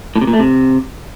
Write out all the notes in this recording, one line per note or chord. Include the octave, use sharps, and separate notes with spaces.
A2
C3
A#2
A3
C3